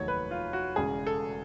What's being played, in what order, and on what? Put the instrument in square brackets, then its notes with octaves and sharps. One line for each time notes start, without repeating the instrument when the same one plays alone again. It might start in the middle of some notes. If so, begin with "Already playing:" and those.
Already playing: [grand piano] F1 D#2 D#3 F#3 C#5
B4
F4
F#4
E1 E2 C#3 G#4
A4